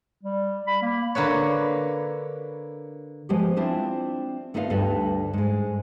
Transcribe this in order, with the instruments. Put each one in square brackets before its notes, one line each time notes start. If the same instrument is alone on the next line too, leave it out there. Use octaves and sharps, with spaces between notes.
[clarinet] G3
B5
A#3
[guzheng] D3 A#3 B4 C#5
[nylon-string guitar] F3 G#3 A#3 B3 G4
C4 D4 E4 F4 C5
A3 B3 D#4 F4 D#5 F5
D2 G2 G3 D4 A4 B4
G#2 G#3